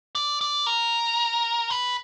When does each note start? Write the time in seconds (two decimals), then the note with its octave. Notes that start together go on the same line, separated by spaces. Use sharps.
0.15 D5
0.41 D5
0.66 A#4
1.70 B4